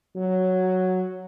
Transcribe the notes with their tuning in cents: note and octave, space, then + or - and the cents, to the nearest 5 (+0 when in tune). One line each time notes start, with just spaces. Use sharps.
F#3 +0